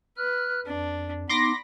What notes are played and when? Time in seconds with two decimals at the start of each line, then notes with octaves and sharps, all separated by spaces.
0.17 B4 F6 F#6
0.66 F2 D4
1.29 B3 D#4 B5 C6 D6 A#6